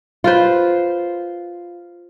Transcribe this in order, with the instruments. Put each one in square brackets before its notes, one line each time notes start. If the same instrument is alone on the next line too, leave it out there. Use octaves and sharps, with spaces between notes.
[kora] F4 B4 C5